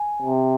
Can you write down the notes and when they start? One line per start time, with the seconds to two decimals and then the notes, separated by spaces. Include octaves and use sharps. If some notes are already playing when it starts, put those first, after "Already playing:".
Already playing: G#5
0.22 C3